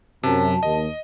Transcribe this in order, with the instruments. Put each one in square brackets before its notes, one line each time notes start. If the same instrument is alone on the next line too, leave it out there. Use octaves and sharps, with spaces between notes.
[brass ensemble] F#2 [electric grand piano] C3 [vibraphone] A5
[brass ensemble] D#2 [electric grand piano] D#5